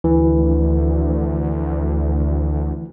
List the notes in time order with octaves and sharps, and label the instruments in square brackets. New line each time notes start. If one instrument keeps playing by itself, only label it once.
[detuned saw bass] D2 [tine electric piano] E3